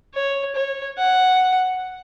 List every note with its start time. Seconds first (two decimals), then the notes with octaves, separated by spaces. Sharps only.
0.15 C#5
0.55 C#5
0.98 F#5